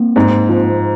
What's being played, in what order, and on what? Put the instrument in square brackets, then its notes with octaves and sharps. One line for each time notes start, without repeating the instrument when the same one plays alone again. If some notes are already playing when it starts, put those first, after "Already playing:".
Already playing: [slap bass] A#3 C4
[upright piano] G#2
F3